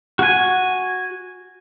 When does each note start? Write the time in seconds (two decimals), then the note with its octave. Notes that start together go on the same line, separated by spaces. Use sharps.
0.19 F#4 G#5